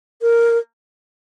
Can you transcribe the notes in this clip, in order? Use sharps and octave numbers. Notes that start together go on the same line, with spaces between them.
A#4